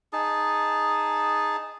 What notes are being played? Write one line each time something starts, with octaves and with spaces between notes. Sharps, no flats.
D#4 G#4 A5